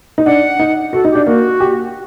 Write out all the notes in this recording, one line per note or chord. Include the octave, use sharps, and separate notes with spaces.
D#4
D4 F#5
D#4
F#4 A4
D#4
D4 G4
A#3 F#4
G4